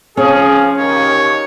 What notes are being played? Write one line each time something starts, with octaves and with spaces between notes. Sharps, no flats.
F3 C#4 G#4
D#2 C#5